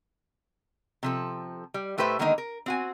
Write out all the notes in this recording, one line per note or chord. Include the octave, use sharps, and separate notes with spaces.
C3 F3 A4
G3
A2 A3 G4 B4 C5 E5
D3 D#3 G#3 A#3 B3 D#4
A#4
C4 F#4 G#5